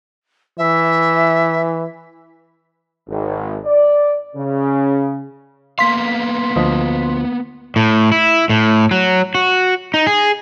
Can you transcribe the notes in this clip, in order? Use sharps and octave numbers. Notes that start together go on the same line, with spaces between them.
E3 E5
G#1
D5
C#3
A#3 B3 F5 C6 B6
D2 F3 D#5
A2
E4
A2
F#3
F#4
D#4
G#4